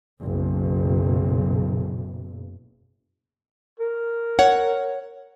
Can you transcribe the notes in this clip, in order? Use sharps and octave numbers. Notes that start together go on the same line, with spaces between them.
F#1 B1
A#4
C#5 F#5